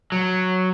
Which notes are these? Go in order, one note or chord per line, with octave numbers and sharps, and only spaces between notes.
F#3